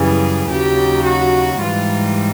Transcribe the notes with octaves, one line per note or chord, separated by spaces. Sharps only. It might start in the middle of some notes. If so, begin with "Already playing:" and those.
Already playing: F#2 C#3 E3 G3 G#4
D#2 C#3 F#3 G4
F#4
G#2 E3 G3 F4